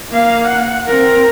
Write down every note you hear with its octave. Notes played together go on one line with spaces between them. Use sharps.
A#3 F5
F#5
C4 A#4